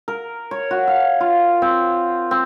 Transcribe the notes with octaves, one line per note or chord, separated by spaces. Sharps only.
A#4
C#5
F#4
F5
F4
C4
C4